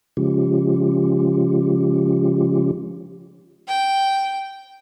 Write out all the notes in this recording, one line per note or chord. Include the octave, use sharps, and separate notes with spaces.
C#3 F3 G#3 C#4 F4 G4
G5